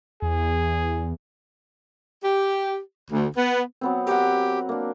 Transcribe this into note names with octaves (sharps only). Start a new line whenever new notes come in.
E2 G#4
G4
D2
B3
F#3 B3 C4
G4 A#4 F#5
A#3 D4